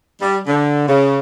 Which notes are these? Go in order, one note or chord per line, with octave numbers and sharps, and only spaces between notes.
G3
D3
C#3